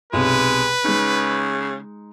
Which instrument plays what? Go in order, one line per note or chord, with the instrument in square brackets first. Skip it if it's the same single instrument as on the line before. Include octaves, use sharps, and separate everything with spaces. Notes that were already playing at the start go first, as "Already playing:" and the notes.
[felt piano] B1 C3 [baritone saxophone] G#3 [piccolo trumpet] B4
[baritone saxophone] C#3 [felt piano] G#3 D#4